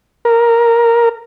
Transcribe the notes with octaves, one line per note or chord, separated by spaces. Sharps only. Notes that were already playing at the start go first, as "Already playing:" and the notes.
A#4